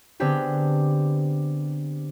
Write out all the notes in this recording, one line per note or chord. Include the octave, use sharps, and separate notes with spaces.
D3 B3 C4 D4 G4 G#4